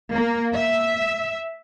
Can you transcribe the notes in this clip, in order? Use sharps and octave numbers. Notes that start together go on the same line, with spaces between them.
A#3
E5